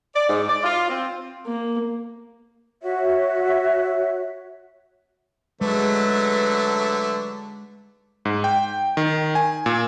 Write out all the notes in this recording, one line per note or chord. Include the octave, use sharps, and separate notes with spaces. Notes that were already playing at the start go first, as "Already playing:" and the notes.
D5
G#2
D5
F4
C4
A#3
F#4 C#5 E5
D3 F#3 G#3 A3 B4
G#2
G5
D#3
G#5
A#2